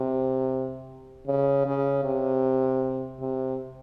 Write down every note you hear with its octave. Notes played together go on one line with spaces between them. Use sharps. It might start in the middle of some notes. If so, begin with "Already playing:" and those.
Already playing: C3
C#3
C#3
C3
C3